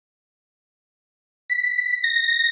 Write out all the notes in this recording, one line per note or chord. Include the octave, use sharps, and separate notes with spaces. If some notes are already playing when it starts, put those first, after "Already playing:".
B6
A#6